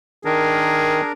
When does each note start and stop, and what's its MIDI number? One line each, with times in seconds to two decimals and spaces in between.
0.25 1.02 51
0.25 1.12 62
0.25 1.11 68
0.25 1.12 70